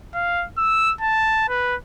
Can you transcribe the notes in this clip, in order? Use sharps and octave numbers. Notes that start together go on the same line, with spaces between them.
F5
E6
A5
B4